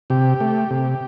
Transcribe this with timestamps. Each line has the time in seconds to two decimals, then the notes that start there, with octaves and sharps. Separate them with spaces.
0.10 C3 G4
0.40 A3
0.71 C3